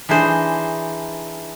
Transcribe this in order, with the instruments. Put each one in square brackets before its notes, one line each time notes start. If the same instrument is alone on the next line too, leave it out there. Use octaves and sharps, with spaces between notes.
[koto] E3 D4 D#4 G#4 C5